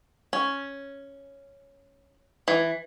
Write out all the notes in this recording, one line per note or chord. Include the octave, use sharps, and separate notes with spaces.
C#4
E3